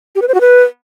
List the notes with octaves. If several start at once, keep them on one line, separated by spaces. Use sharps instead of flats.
G4
B4
C5
F#4
B4